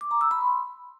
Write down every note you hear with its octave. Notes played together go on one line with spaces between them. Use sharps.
D6
A#5
E6
B5
C6